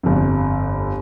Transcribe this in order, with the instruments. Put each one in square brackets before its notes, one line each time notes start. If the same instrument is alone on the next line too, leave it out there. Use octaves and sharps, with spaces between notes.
[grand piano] G1 F2